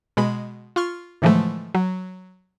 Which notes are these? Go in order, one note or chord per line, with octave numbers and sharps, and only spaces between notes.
B2 G#3 B5
F4 C6 C#6 F6
A2 D3 E3 F3 G#3 A3
F#3